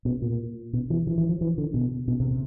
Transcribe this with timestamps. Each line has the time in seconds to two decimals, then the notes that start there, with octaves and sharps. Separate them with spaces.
0.05 B2
0.22 A#2
0.73 B2
0.90 E3
1.07 E3
1.18 E3
1.29 F3
1.41 E3
1.58 D3
1.74 B2
2.08 B2
2.20 C3
2.31 C3